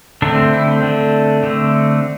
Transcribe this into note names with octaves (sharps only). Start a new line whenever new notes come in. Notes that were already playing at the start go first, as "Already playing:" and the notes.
D3 A3 C4 D4
E4
D3 A3 C4 D4
D3 A3 C4